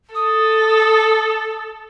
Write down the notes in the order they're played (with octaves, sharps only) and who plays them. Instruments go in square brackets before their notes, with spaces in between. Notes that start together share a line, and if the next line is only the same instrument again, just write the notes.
[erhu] A4 [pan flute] D#6